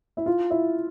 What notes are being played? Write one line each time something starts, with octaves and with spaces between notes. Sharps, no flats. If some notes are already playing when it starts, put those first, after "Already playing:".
E4
F4
E4